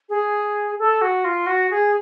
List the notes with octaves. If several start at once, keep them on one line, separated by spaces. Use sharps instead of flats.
G#4
A4
F#4
F4
F#4
G#4